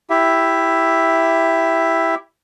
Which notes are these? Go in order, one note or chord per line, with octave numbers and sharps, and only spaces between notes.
E4 G4 E5